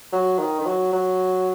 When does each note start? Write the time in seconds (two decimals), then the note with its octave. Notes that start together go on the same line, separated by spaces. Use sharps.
0.13 F#3
0.39 D#3
0.60 D#3
0.66 F#3
0.92 F#3